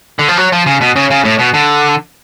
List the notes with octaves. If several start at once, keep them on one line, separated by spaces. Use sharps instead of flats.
D3
F3
F#3
F3
C#3
B2
C#3
C#3
A2
B2
D3